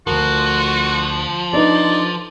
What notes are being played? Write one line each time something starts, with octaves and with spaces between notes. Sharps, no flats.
D2 G2 F3 F#4 A#4
D4 D#4 A4 B4 D5